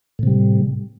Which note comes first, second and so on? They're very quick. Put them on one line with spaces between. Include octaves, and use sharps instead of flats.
A2 C3 G3